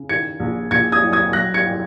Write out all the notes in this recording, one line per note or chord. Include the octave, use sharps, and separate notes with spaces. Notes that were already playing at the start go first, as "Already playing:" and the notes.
Already playing: C#3
D#3 G#6 C#7
A#1
A#1 G#6 C#7
D#6 G#6
F#3
D#6 G#6
F#3 F#6 A#6
G#6 C#7